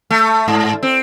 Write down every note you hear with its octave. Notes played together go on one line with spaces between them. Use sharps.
A3
G#2
C4